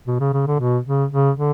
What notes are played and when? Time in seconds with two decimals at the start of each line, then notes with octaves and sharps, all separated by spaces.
0.07 B2
0.20 C#3
0.33 C#3
0.47 D3
0.60 B2
0.86 C#3
1.12 C#3
1.38 D3